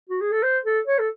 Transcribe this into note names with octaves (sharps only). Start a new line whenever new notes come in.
F#4
G#4
A4
C5
A4
C#5
A4